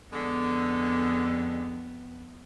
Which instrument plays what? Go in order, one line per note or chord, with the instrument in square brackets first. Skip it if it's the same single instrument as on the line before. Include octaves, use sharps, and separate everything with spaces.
[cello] F2 B3 [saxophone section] D3 G#3